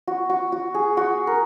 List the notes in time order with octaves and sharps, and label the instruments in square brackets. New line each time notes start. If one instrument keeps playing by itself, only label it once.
[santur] F#4
F#4
F#4
G#4
F#4
A#4